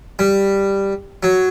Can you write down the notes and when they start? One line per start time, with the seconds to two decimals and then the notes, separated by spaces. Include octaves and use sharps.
0.19 G3
1.23 F#3